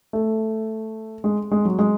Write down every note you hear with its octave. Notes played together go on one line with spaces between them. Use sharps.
A3
G#3
G#3
F#3
G#3